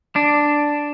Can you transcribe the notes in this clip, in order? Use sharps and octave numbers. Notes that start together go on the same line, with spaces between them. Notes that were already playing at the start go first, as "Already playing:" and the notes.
D4